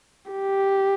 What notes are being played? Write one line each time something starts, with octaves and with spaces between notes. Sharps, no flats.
G4